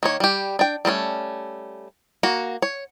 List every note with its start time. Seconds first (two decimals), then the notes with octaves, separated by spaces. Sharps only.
0.03 D#3 A#3 C#5
0.20 G3 G4
0.59 D4 G5
0.85 G3 A3 C4 C#4
2.23 A#3 F#4
2.62 C#5